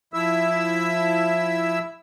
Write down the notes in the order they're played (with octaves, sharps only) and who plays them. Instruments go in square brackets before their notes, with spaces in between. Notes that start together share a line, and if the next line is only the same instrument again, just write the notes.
[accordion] F3 E4 E5 E6